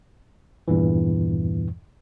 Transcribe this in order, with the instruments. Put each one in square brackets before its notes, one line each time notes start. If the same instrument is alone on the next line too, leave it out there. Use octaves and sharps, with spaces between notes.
[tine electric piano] E2 G2 A#2 E3